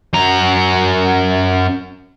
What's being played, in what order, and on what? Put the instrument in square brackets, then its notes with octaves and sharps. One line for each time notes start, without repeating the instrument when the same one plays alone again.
[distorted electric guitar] F#2 A#5